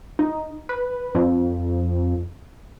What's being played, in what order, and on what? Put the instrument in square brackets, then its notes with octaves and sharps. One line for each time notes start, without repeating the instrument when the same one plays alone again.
[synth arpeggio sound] D#4
B4
F2